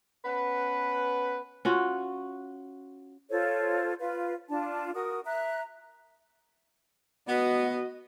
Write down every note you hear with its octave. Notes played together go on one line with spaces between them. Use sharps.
B3 C#4 B4
C#4 F4 F#4
F4 A4 C5 C#5
F4 B4 F5
D4 F4 A5
F#4 A#4 D#6
E5 A#5 F#6
B3 F#4 D#5